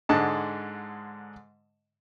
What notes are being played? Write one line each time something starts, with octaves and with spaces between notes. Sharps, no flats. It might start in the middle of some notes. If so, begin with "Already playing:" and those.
G#2 D3 G#3 A5